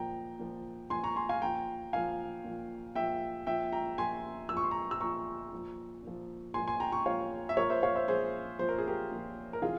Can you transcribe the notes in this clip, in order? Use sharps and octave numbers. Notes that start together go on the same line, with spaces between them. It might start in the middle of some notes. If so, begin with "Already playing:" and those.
Already playing: A#2 F3 G5 A#5
A#2 F3
A#2 F3 G#5 C6
A#5 C#6
G#5 C6
F5 G#5
A#2 F3 G5 A#5
A#2 F3 F5 G#5
A#2 F3
A#2 F3 E5 G5
A#2 F3 E5 G5
G5 A#5
A#2 F3 G#5 C6
A#2 F3 E6
C#6
C6
A#5 C#6
E6
A#2 F3 A#5 C#6
A#2 F3
A#2 F3
A#2 F3 G#5 C6
G#5 C6
G5 A#5
A#5 C#6
A#2 F3 C#5 F5
E5
A#2 F3 A#4 C#5
C5 E5
C#5 F5
C5 E5
A#2 F3 G#4 C5
A#2 F3 C5
A#4
G#4
G4 A#4
A#2 F3
A#4
C3 E3 F4 G#4